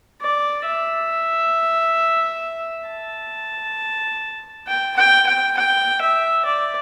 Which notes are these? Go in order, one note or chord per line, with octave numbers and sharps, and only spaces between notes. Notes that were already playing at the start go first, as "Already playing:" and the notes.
D5
E5
A5
G5
G5
G5
G5
E5
D5